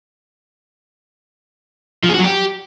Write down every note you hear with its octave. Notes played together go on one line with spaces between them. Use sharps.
F3
G#4
F#4
F#3
G4